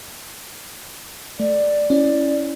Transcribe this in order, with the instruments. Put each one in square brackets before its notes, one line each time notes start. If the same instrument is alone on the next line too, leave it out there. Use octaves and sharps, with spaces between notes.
[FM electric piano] A3 [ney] D5
[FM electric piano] C#4 E4